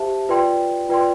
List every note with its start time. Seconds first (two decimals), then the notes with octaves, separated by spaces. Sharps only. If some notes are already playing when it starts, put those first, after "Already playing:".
Already playing: G4 C5 E5 A5
0.29 F4 B4 D5 G5 C6
0.89 F4 B4 D5 G5 C6